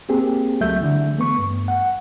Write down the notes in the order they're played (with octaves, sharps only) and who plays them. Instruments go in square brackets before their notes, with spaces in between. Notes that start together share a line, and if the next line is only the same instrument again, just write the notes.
[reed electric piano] A#3 C4 G4 G#4
C#2 F#3 A3 E5 G6
D3 E3
A3 B3 C#6
G2
F#5